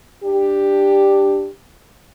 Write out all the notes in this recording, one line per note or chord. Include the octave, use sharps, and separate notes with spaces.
D4 G4